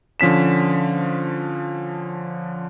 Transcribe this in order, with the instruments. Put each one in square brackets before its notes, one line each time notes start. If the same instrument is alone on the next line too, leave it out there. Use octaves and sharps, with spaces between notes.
[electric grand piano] D3 F3 C#4 B6 E7